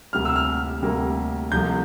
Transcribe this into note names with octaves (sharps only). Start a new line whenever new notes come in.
D2 C3 G3 A#3 F6
E6
F6
D2 C3 G3 A#3
C2 C3 F3 A3 G6